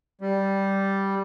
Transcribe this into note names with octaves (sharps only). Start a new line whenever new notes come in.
G3